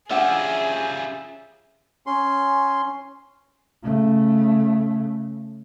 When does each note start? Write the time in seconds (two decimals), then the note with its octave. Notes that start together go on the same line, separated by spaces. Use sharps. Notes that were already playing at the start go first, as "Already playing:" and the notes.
0.11 C#4 D4 F4 G4 G#4 E5 F#5
2.06 C#4 C6
3.84 C#3 A3